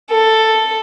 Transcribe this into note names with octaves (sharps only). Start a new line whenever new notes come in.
A4